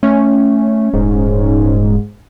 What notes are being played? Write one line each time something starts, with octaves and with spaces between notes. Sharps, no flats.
A3 C#4
D#1 G#2